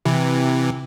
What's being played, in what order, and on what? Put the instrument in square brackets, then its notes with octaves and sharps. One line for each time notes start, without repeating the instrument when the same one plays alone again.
[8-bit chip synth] C3 E3